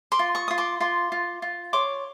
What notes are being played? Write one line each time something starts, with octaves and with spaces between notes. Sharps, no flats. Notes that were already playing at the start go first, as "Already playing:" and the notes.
C6 D6
F4
C#6 D#6
F4 D#6
C6 D6
F4 C6 D6
F4
F4
C#5 C6 D6